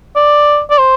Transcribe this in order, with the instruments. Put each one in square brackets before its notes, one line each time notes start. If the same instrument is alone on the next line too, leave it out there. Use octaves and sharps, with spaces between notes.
[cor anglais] D5
D5
C5